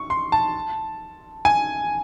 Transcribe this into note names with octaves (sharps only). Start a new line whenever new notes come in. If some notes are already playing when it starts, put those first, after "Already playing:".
Already playing: C#6
C6
A5
G#5